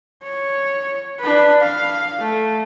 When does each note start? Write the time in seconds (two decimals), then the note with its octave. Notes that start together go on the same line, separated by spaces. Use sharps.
0.24 C#5
1.19 D4 B4
1.60 F5
2.20 A3